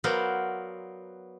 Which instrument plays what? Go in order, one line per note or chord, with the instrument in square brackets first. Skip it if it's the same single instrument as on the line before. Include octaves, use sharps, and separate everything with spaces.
[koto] F#3 B3 A#4 C5 D5 F5